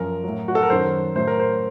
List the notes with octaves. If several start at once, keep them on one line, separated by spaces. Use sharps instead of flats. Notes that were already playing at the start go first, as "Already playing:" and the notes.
Already playing: F#2 F3 A#4
A2 F#3
F#4
A4
A#4
F#2 D#3 F#3 C5
A2 F#3 C5
A#4
C5